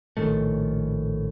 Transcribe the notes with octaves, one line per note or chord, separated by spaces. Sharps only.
A#1 A2 D#3 A3